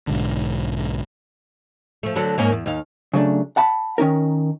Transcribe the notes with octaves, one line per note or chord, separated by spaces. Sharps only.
B1 G#2 D3
F3 A3
D3 F#3 A3
G#2 A#3 C#4
E2
D#2 F5
C#3 F#3 A3 D4
F#5 A5 B5
D#3 C#4 D#4 A#4